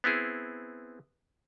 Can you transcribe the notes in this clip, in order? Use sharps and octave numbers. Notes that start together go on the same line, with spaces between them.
B3 C4 E4 G#4